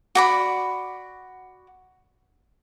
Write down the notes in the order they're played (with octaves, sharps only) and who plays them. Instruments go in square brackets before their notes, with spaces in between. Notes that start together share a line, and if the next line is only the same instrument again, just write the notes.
[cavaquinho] F#4 D5 B5